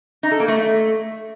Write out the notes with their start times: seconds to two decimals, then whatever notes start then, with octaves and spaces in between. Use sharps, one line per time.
0.23 D#4
0.32 A4
0.40 A#3
0.48 A3